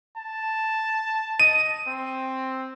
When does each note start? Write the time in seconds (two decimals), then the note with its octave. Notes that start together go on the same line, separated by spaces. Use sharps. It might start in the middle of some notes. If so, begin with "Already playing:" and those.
0.16 A5
1.40 D#5 D#7
1.87 C4